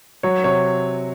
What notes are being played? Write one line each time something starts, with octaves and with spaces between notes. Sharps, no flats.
F#3 C#5
C3 C#5